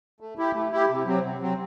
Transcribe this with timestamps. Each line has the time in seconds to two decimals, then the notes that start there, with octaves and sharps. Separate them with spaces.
0.20 A3
0.38 E4 G4
0.54 A3
0.72 E4 G4
0.89 C3
1.06 F#3 C4
1.23 C3
1.40 F#3 C4